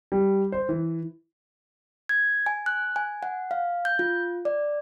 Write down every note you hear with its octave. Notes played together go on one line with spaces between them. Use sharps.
G3
C5
E3
G#6
G#5
F#6
G#5
F#5
F5
G6
F4
D5